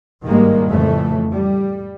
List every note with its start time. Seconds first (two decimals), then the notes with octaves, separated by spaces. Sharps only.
0.23 G#1 G2 D#3 G3 G#3 A#3
0.67 F2 A2 C#3 E3 A3
1.33 G3